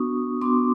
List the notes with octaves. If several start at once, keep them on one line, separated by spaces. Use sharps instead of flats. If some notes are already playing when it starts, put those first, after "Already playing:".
Already playing: B3 D4 F#4 C#6 D#6
B3 D4 F#4 C6 D6